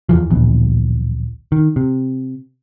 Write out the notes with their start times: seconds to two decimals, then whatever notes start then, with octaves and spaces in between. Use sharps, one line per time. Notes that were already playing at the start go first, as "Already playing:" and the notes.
0.09 E2 E3 F3
0.30 D1 A#1 E2
1.52 D#3
1.76 C3